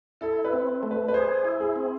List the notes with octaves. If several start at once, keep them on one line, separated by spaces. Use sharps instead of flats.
E4 A4
B4
C4
A3
B4
B4
G#4 C5
E4
G#4
C4